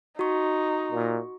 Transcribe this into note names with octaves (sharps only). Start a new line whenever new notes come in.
D#4 F#4 C#6
A#2